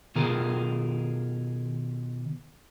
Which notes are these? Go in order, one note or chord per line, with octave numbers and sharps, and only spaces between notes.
B2 D#3 F4 G#4 A#4